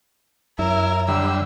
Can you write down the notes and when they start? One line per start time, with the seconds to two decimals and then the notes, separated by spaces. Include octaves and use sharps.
0.59 F#2 E4 A#4
1.08 D3 G3 E6